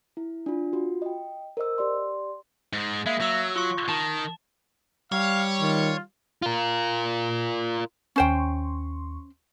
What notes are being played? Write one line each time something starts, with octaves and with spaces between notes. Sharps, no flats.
E4
D4 F4
F4 F#4
D#5 G5
A#4 C5 D#5 E6
G4 D5 C6
G#2 G#3
G#3 A#3 E5
F#3 E6 A#6
F4 C#6
D#3 A5
G3 C#5 F5
D#3 F4
F4 A#4
D#2 C#4 C5 G5 C6 C#6